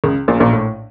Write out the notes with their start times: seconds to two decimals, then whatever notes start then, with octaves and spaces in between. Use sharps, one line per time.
0.04 C#2 C#3
0.28 A#1 A#2
0.40 A#1 A#2
0.53 A2